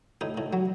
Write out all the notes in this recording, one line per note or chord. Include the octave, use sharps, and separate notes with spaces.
A2 D#4
A2
F#3